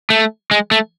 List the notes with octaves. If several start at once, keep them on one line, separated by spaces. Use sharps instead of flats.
A3
G#3
A3